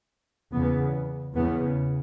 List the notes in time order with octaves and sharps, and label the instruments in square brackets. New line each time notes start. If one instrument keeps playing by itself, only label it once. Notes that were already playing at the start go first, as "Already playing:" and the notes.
[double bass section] E2 C#3 B3
E2 C#3 B3